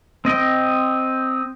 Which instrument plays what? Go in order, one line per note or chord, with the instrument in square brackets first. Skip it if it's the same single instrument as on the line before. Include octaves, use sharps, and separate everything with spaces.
[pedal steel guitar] C4 D#5 G5